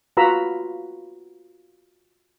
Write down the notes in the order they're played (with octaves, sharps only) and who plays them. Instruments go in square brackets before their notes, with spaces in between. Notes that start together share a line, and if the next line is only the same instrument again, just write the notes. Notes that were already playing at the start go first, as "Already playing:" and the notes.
[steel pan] F4 F#4 B4 A#5 B5 E6